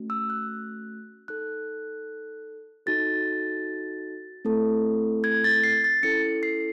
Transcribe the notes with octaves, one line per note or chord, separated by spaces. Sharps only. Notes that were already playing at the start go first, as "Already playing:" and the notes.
Already playing: A3 C#4 F#4
E6
F#6
D#4 A4 F#6
D#4 F#4 A4 A6
A3 C4 E4 A4
G#6
A6
C7
A6
C#4 E4 A4 C#7
C7